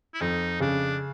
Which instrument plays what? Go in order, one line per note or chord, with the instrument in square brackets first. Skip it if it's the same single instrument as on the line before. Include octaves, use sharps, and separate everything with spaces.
[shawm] E4
[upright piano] F2 [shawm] D#4
[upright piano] C#3 [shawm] D4